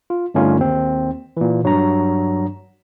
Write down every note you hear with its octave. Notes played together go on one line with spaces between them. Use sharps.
F4
G2 D3 A3 C#4 D#4 F4
D#2 C4
A#2 E3
G2 F#3 D4 A#5